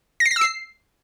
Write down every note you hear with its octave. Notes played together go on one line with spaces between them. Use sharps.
A#6
C7
A#6
E6
C7